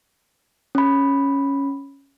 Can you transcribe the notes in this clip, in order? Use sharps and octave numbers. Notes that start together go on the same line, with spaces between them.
C#4 B5